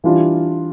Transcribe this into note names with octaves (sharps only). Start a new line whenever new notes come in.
E3 G3 D4 F4